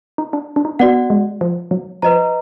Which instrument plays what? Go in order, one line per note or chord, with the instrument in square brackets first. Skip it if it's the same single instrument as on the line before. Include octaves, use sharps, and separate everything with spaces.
[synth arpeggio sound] D#4
D4
D4
D#4
[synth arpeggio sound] B3 [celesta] F#4 D5 F#5
[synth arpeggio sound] G#3
F3
F#3
[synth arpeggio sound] F3 [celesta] B4 D#5 A#5